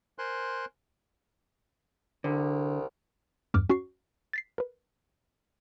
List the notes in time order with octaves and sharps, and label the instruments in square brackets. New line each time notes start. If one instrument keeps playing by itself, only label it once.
[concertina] A#4 C5 G#5 C6 F#6
[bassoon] C2 [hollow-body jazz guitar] D3
[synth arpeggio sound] E2 G2 D6 F6
C#4 F#4 C#6 C7
A6 B6 C7
A#4 B4